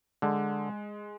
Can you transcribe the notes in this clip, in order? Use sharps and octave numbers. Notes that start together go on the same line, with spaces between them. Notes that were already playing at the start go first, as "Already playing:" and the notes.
D3 G#3